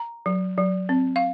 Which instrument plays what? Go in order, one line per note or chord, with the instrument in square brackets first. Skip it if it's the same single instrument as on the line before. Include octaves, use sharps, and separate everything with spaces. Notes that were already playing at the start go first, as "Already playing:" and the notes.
Already playing: [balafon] A#5
F#3
F#3
C4
F5